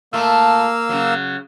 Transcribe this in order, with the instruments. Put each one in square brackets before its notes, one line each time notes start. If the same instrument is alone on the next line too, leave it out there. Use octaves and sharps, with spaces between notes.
[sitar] A#2 A3 [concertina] A#3 F5 E6
[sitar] C#3 F#3